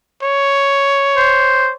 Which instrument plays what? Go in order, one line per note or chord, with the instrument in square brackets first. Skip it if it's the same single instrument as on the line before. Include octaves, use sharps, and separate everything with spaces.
[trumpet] C#5
[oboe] C5